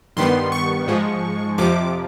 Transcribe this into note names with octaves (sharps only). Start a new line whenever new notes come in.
G2 D#3 G3 B3 C6
C#6
G#2 F3 G#3
F2 C3 F3 D6